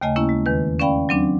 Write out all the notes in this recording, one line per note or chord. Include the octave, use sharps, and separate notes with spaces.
D#2 C#3 A3 D#5 G#5
A#3 C#4 E4
G#3
E2 D#3 B4
C#4 D5 F5 G5 B5
F#3 C4 D4